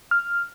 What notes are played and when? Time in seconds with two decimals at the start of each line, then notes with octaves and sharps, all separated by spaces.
0.11 F6